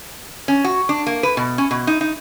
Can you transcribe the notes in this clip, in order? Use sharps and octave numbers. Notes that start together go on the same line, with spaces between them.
C#4
F#4
D4
A#3
B4
B2
C#4
B2
D#4
D#4